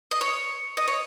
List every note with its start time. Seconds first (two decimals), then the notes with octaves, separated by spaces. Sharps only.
0.11 D#5
0.21 C#5
0.77 D#5
0.88 C#5